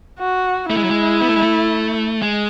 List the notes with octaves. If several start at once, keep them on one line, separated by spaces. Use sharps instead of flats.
F#4
A3 E4
G#3
F#3
G#3
B3
A3
G#3
A3
G#3